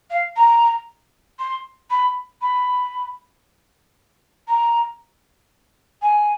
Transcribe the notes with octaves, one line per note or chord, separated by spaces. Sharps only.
F5
A#5
C6
B5
B5
A#5
G#5